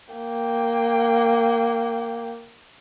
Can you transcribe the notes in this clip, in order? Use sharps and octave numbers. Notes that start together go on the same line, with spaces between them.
A#3 G5